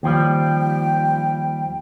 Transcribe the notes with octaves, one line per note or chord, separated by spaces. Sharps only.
D#2 F3 G3 G5